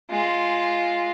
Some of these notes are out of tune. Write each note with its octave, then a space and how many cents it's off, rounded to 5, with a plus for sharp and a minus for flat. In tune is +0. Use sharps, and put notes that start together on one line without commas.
G#3 +0 F4 +0